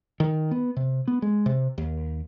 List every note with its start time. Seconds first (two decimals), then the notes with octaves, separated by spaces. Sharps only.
0.20 D#3
0.51 B3
0.77 C3
1.08 B3
1.22 G#3
1.46 C3
1.78 D#2